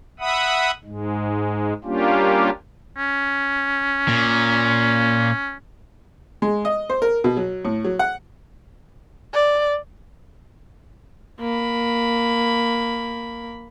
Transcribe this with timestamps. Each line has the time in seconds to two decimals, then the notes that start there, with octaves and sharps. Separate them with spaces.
0.20 E5 F#5 B5 D#6
0.84 G#2 G#3
1.84 G3 A#3 C#4 D4 F4 G4
2.97 C#4
4.08 A#2
6.42 G#3
6.65 D#5
6.90 C5
7.02 A#4
7.24 B2
7.37 F#3
7.65 A2
7.85 F#3
7.99 F#5
9.34 D5
11.40 A#3 B5